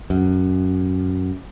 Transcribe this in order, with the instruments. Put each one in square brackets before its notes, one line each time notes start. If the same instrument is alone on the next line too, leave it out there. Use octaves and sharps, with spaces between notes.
[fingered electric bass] F#2